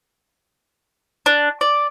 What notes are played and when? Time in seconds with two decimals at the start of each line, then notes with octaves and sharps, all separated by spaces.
1.26 D4
1.61 D5